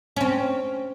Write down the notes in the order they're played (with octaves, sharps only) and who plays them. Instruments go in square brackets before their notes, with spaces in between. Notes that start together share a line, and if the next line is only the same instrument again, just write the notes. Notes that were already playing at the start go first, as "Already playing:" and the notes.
[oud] C4 C#4